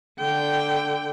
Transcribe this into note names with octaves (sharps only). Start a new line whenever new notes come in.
D3 G5